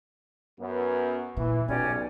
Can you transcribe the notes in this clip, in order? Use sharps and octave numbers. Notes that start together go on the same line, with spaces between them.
F#2 B3
A#2 E3
B1 B2 C#4 G4 D5